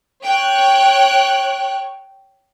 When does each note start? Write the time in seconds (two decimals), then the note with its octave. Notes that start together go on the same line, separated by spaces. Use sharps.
0.23 C#5 G5 F#6